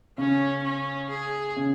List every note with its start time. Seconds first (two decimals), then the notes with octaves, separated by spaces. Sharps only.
0.18 C#3 C#4
0.64 C#4
1.10 G#4
1.56 C#3